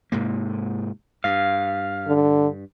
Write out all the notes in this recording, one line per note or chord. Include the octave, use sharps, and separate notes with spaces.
G#2 C3 A#3
G2 F5
D3